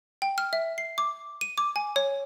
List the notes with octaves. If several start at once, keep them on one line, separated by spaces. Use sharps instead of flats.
G5
F6
E5
C7
D6
D#7
D6
G#5
C#5